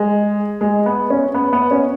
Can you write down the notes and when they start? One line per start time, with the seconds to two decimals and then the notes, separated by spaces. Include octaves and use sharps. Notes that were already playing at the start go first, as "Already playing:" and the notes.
Already playing: G#3
0.61 G#3
0.86 B3
1.10 C#4
1.34 B3
1.53 B3
1.71 C#4